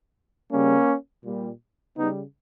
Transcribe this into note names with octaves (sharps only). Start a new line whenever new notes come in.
C#3 G3 A#3 C#4
A#2 G3
C#3 G3 B3 D#4